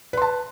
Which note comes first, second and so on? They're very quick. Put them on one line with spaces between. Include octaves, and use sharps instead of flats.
B4 C6 A5